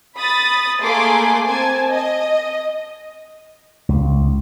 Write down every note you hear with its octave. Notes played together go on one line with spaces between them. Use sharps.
B5 D#6 A6
A3 A#3 G#4 C6 D6
C4 G#5 A5
D#5
C#2